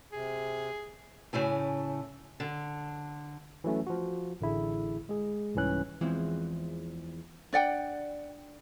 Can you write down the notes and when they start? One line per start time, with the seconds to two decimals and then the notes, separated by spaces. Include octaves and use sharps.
0.12 C3 G#4
1.33 A2 C#3 A3 E4 G#5
2.40 D3
3.64 E3 F#3 A3 C#4
3.87 F3 F#4
4.41 A1 D3 E4 G#4
5.09 G#3 G#4
5.55 C2 G#2 E3 C#4 F#6
6.01 E2 E3 F3 G#3 C4
7.53 D4 D5 F#5 G5